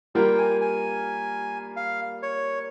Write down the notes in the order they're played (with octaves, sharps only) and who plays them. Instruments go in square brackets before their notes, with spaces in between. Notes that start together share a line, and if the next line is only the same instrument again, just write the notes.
[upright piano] G3 A#3 F4 A#4 [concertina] G5
[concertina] G#5
G#5
F5
C#5